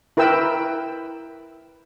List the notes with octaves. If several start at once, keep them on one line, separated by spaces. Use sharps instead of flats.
E4 A#4 B4 G5 E6